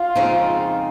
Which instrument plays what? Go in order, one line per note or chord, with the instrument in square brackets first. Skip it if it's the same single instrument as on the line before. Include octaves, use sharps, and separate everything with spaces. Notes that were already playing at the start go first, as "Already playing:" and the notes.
Already playing: [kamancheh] F4
[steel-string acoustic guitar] F2 C#3 G#3 C4 D#4